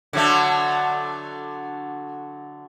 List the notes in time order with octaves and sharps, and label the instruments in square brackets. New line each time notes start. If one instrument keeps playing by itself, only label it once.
[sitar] D3 F#3 A3